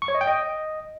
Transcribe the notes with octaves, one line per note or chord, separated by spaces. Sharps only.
C#6
C#5
D#5
G5
D#5